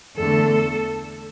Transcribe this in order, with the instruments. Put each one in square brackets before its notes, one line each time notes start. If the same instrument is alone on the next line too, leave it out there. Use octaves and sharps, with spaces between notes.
[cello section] E2 D3 A3 A4